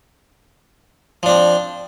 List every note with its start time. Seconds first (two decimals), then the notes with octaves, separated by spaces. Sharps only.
1.23 F3
1.26 D4
1.29 C4